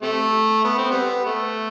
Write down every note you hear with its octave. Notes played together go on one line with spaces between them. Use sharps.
C3 A3
B3
C4
G3 B3
A3